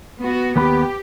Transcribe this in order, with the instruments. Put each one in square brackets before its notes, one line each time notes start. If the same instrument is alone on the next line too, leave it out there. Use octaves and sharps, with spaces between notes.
[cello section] B3 F#4
[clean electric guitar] D#2 B3 B5 [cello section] G4